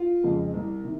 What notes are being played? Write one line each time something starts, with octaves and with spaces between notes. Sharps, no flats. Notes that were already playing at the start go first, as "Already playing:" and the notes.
Already playing: F4
F2 C#3 G#3
C2
C3 D#3